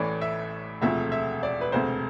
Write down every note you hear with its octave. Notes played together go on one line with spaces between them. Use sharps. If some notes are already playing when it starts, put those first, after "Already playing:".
Already playing: A1 A2 E3 A3 D5
E5
E1 D2 C3 F3 A3 E5
E5
D5
B4
E1 D2 C3 C5